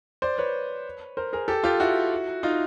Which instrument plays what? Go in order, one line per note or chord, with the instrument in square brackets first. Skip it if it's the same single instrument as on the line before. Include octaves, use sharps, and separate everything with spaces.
[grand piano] C5 D5
B4 C#5
A#4 C5
G#4 A#4
G4 A4
F4 G4
E4 F#4
D#4 F4